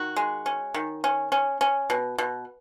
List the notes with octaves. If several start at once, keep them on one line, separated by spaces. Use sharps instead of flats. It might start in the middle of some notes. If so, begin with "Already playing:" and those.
Already playing: D#3 F#4
G#3
C#4
D#3
C#4
C#4
C#4
B2
B2